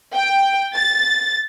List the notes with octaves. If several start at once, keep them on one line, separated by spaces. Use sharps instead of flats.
G5
A6